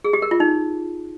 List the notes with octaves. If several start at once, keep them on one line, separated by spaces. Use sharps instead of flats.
G#4
G4
A#4
F4
D#4